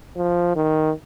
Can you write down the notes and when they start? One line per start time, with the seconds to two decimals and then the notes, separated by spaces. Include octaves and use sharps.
0.17 F3
0.56 D#3